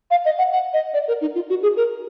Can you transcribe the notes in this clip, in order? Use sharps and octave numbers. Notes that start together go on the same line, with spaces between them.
F5
D#5
F#5
F#5
D#5
D5
A#4
D#4
F4
F#4
G#4
A#4